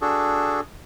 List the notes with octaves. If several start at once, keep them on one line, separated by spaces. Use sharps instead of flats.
D4 F#4 G#4 A4